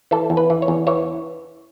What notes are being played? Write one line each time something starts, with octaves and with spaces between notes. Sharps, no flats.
E3 A4
E2
B4
E3
C#5
E2
E3 C#5